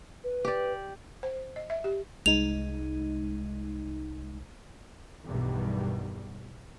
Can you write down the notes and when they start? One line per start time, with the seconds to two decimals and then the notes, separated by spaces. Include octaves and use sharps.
0.24 B4
0.45 G4 D5
1.23 C5
1.56 D#5
1.70 E5
1.84 G4
2.26 C2 G#3 D#4 F7
5.24 B1 E2 G2 B2 D#3 G3